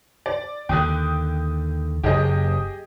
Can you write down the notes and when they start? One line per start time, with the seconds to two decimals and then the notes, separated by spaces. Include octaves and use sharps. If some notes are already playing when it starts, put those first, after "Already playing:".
0.26 D5
0.69 D#2 D3 G5 D#6 F#6
2.03 F#1 G4 G#4 D#5